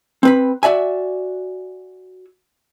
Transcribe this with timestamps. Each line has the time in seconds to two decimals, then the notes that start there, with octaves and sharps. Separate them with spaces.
0.23 C4 B4 B5
0.63 F#4 D5 E5 G#5